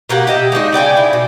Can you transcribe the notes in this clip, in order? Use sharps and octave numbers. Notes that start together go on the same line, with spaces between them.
B2 A#3 G4 F#5
G4 D#5 E5
G#3 D4 D#4 F#4
C#3 D5 G5 G#5
E4
B2